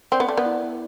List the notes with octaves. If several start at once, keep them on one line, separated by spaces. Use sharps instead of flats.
C4 D5
B3
A3 D5
B3
E4
E4